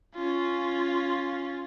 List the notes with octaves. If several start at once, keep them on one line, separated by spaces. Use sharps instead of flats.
C#4 F4